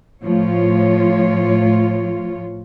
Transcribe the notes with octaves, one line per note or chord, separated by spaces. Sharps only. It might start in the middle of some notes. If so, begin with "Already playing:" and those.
A2 F3 F4 C#5